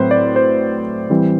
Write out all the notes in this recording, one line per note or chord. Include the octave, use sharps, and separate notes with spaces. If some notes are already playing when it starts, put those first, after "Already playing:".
Already playing: A2 F#3 C4 B4 C5
D5
C5
E3 G3 C4